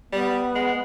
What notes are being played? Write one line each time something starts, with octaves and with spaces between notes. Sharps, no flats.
G3 B3
G#3